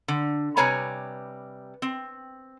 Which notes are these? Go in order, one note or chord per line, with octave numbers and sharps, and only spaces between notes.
D3
C3 G3 B4 C#5 G#5 A#5
C4